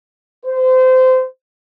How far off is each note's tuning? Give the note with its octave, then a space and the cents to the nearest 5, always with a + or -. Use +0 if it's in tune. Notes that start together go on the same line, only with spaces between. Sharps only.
C5 -25